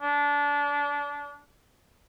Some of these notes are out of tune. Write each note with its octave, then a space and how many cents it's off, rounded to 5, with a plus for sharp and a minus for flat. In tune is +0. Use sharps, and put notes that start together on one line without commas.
D4 -25